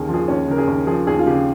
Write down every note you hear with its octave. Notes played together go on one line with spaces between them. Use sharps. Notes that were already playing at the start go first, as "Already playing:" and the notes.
Already playing: D#2 C#3 G#4 A#4
F3
G#4
D#2 C#4
C#3 A#4
G#4
D#2
F3 G#4
D#2 G#4
F4
C#3 G4